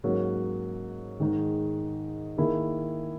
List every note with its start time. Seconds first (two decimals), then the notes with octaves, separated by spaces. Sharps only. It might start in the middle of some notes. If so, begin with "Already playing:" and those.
0.04 G#2 F#3 A#3 C#4 F#4
1.20 G#2 D#3 G#3 D#4
2.38 D#3 A#3 E4 G#4